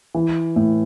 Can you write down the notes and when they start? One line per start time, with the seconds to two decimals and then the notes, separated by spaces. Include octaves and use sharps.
0.15 E3
0.56 A2